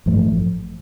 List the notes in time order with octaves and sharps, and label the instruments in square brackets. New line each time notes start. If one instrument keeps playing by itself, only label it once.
[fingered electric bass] A1 G2 F3 A3